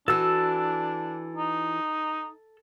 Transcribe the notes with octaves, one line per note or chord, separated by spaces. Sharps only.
E3 D4 F#4 A4 E6
D#4